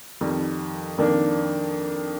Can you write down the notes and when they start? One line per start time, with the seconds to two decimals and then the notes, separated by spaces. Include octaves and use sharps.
0.21 F2 D#3 G3
0.98 F2 D#3 A#3 D4